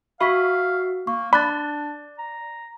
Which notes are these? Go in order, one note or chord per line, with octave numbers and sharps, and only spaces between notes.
F#4 E5 F5 B5 C#6 B6
A#3 C#6
D4 D5 B5 D6 F#6 A6
A#5